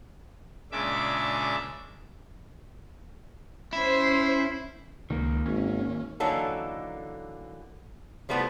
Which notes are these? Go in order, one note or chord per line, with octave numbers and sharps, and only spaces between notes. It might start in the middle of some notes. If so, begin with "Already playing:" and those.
A#2 C#3 G#3 D4 E5 D6
C#4 E4 C5
C#2 D#3 A#3
G#1 C#4
D3 E3 F#3 A#3 D#4 A4
F3 G3 A3 B3 E4 G4